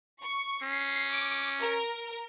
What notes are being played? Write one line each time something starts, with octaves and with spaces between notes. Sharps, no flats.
C#6
C#4 C7
D6
A#4